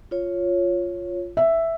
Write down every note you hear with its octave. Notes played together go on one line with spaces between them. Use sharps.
F4 C#5
E5